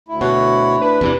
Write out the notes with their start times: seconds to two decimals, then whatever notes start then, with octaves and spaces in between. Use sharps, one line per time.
0.08 D2 E4
0.21 B2 F#4 C#5 F#5
0.81 D4 B4
1.01 E2 C3 E3